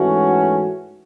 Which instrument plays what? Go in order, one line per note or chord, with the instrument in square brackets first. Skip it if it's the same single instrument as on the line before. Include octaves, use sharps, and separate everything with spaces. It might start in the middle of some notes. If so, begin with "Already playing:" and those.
Already playing: [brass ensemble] G#2 E3 A3 C#4 F#4